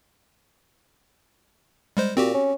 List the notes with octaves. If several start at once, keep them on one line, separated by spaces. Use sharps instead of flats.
G3 G#3 C5
A#2 C4 F#4 G4
C#4